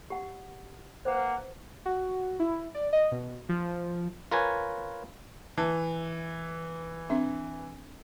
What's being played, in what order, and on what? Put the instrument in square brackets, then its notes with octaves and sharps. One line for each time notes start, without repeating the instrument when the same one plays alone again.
[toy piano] G4 F#5
[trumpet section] A#3 F#5 [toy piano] B4 C5
[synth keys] F#4
E4
D5
D#5
B2
F3
[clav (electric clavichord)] F4 A#4 B4 C#5 G#5
[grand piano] E3 [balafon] A5
[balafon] C4 D4 E5